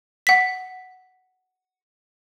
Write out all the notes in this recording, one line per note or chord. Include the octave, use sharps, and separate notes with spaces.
F#5 B6